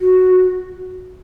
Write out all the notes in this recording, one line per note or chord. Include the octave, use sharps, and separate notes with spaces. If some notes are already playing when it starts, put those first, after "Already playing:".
F#4